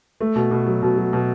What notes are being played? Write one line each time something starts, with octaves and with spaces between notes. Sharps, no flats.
A3
B2
B2
F#3
B2
F#3
B2